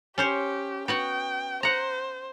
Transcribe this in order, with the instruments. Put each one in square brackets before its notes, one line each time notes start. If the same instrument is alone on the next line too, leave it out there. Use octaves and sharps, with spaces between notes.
[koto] C#4 C5 C#5 [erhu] G4
[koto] B3 F#4 F#5 [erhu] G5
[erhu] C5 [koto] F#5 A#5